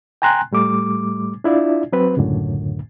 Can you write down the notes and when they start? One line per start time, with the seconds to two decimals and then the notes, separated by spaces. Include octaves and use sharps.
0.22 G5 G#5 A#5 C6 F#6
0.52 A2 G3 A3 D6
1.44 D4 E4 F4 D5 E5
1.93 F#3 C4 B4
2.17 C#2 F#2 A2 D3